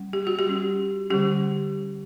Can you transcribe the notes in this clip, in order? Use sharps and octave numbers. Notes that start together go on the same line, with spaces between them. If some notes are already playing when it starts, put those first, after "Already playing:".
Already playing: G3 C#4
G4
F#4
G4
G3 C#4
D3 G3 C#4 G4